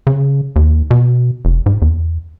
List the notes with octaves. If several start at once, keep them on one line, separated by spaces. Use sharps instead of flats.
C#3
D#2
B2
F1
G#2
E2